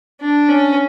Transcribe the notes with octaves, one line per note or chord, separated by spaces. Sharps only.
D4
C#4